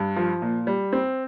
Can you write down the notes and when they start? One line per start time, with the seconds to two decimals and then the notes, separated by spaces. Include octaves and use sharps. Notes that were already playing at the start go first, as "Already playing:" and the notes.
Already playing: G2
0.16 F3
0.42 A#2
0.67 G3
0.93 C4